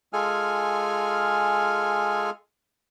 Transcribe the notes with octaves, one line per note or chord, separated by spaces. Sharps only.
G#3 F4 G#4 A4 G#5 F6